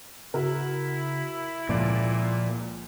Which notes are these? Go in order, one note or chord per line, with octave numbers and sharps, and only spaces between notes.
C#3 E4 F#4 A#4
C#2 A#2 F3 D5 D7